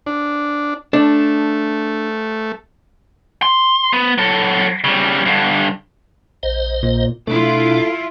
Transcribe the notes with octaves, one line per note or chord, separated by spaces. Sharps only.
D4
A3 D4
C6
B3
F#3 A4
C#3 G3
G2 D3
A#1 C5 D#5
A#2
B2 A3 D4 E4 F4